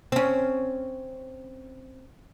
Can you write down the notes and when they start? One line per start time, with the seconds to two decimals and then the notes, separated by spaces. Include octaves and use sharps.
0.12 C4 C#4